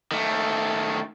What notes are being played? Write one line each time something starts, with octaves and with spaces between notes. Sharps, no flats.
D#3 A3